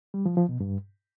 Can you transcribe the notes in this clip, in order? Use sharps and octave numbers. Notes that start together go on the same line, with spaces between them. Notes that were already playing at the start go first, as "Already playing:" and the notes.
G3
F3
F3
B2
G2